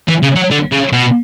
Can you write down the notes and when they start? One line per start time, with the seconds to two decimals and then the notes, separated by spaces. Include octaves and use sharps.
0.08 E3
0.23 C#3
0.36 F#3
0.51 D3
0.72 C#3
0.93 B2